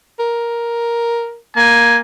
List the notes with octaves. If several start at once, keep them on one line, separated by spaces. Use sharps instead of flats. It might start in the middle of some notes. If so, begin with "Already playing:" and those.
A#4
A#3 G#5